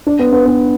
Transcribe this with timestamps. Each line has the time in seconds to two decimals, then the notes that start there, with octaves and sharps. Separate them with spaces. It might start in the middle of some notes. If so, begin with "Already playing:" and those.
0.06 D4
0.19 B3
0.32 B3
0.46 B3